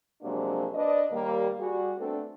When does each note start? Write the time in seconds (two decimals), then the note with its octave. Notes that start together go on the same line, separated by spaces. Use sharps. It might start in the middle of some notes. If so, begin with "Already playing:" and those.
0.23 C3 F3 F#3 G#3 A#3 D4
0.74 D4 B4 C5 D5 D#5
1.11 D#2 G3 A#3
1.59 G3 F#4 G#4
1.99 A3 B3 C4 D4 A4